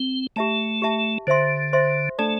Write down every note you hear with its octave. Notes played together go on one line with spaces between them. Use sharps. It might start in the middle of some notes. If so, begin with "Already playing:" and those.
Already playing: C4
A3 G4 E5 A5
G4 E5 A5
D3 C5 E5 C6
C5 E5 C6
A3 D4 A4 D5 A5